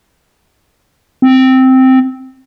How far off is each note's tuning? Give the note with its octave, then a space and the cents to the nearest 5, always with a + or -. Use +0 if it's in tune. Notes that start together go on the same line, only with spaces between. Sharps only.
C4 -5